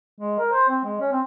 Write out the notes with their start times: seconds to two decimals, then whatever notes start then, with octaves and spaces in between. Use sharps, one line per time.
0.21 G#3
0.39 A#4
0.52 C5
0.69 C4
0.84 G#3
1.01 C#4
1.12 C4